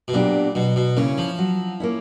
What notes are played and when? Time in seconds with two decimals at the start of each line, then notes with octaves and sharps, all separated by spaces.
0.08 B2
0.13 A#2 F#3 B3 D4 G4
0.55 B2 F#3
0.76 B2
0.97 C#3 A#3 C#4 E4
1.18 F3
1.39 F#3
1.80 A#3 C#4 E4